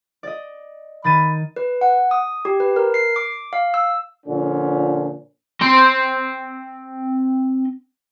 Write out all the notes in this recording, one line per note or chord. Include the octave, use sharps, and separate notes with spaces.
D5 D#5
D#3 B5 A6 D#7
B4
F#5
D#6
G4
B4
A#4
C7
D6
F5
E6
A#2 D3 F3 C#4
C4 C6